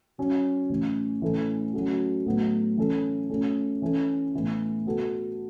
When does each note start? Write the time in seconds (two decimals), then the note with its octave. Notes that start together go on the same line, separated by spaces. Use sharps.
0.18 F#3 C#4 F#4
0.69 A2 E3 C#4
1.22 A2 E3 C#4 E4 A4
1.73 F#3 A3 C#4 F#4
2.26 A2 F#3 B3
2.78 E3 C#4 A4
3.30 B2 A3 C#4
3.82 E3 C#4 E4 A4
4.34 A2 E3 B3
4.86 B2 B3 F#4 A4